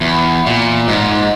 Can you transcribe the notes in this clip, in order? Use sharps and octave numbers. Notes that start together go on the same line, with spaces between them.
E2
A#2
G#2